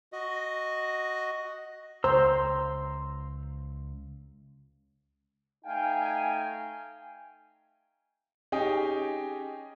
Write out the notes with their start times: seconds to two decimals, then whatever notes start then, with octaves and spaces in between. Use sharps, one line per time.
0.13 F#4 D#5
2.04 C#2 C5 A#5 C6 E6
5.65 A3 D#4 F5 G5 G#5
8.52 C#4 D#4 G4 G#4 G5